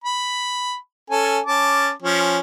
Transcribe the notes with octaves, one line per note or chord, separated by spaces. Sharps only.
B5
C#4 A4 G#5
C#4 A5 D6
F3 C#4